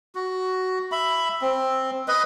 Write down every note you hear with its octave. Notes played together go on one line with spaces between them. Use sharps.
F#4
E5 B5
C4
B4 D#5